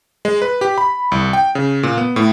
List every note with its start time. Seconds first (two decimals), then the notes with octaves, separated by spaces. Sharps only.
0.25 G#3
0.42 B4
0.61 G4
0.78 B5
1.12 C2
1.33 G5
1.55 C#3
1.83 A#2
1.97 B3
2.16 A2